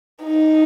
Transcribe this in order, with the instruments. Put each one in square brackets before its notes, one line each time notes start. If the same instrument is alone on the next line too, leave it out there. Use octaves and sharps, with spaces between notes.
[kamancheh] D#4